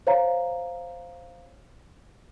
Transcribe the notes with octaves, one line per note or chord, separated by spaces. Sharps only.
C5 C#5 F5 A#5